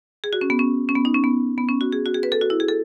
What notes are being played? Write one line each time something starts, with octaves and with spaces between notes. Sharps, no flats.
G#4
F#4
C#4
B3
C#4
C#4
B3
D#4
C#4
B3
B3
C#4
F#4
G#4
F#4
G#4
B4
A4
F#4
E4
G#4
A4